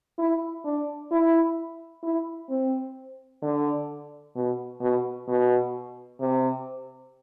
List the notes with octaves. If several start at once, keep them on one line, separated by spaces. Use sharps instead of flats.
E4
D4
E4
E4
C4
D3
B2
B2
B2
C3